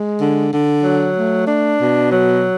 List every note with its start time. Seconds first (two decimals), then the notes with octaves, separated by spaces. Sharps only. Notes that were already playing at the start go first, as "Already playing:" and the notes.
Already playing: G#3
0.19 D3
0.51 D3
0.83 F#3
1.15 A3
1.47 D4
1.81 B2
2.12 F#3